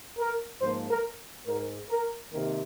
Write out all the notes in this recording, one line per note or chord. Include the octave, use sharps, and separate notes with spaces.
A#4
G#2 F3 A#3 C5
A#4
G#2 G#3 A#4
A#4
C3 D#3 A#3 A#4